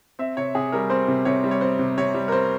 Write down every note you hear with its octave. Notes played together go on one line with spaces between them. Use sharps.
C4 E5
C3 C#5
C3 G#4
G3 A#4
C4 C5
C3
C3 C#5
G3
C#5
C4 C5
C3
C3 C#5
G3
A#4
C4 C5